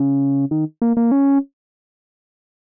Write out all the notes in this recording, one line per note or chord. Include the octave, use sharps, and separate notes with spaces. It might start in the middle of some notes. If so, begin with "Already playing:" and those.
Already playing: C#3
D#3
A#3
A#3
C#4